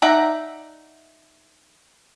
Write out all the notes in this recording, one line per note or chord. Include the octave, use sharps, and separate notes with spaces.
D#4 D5 E5 F#5 A#5